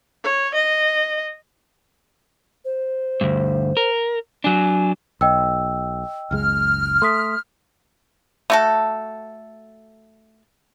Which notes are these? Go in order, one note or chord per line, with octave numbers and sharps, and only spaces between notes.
C#5
D#5
C5
D2 G2
A#4
F#3 D4 G#5
B1 D#5 G5 E6
F#1 C#2 G#3 F6
A3 C6 D#6 B6
A3 F#4 A4